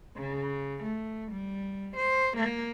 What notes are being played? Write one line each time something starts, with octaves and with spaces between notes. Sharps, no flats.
C#3
A3
G3
C5
A#3